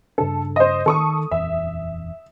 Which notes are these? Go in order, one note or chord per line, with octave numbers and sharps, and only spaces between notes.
G2 C#3 D4 A4
C5 D#5
D#3 A4 C#6 D#6
D#1 F2 E3 E5